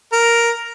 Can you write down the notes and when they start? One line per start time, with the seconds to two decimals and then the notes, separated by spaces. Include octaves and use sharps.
0.12 A#4